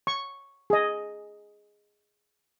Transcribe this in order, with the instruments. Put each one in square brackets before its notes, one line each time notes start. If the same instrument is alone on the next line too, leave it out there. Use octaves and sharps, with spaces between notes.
[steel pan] C#6
G#4 D#5